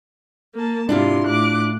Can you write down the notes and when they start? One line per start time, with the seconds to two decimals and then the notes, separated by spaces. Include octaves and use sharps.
0.54 A#3 A5
0.89 G#2 C3 D4 E4 F4 C6
1.27 A2 D6 F#6